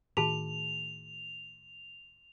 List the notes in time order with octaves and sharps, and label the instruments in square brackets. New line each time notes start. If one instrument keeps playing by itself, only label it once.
[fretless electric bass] A2 D#3 [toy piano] F#4 G#4 A5 [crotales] F7